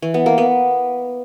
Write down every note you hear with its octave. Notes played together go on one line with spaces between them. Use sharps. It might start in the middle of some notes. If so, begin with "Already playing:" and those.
E3
B3
A#3
B3